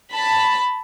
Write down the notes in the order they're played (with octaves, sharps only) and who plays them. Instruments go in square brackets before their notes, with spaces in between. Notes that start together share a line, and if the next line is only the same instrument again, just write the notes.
[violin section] A5 B5